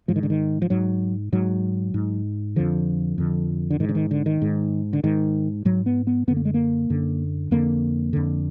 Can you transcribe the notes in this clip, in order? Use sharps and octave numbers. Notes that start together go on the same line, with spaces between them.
G#2 F3
D#3
D3
D#3
F3
G#2 F#3
G#2 F#3
G#2
F2 D3 F3
F2 D3
D3
G#2 D#3
D3
D#3
D3
D#3
G#2
D3
G#2 D#3
G#2 F#3
B3
B3
F#2 D3 B3
A#3
G#3
A#3
F#2 D3
F2 D3 A#3
F2 D3